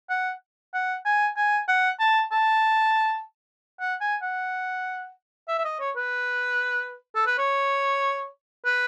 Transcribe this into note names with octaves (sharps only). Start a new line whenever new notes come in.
F#5
F#5
G#5
G#5
F#5
A5
A5
F#5
G#5
F#5
E5
E5
D#5
C#5
B4
A4
B4
C#5
B4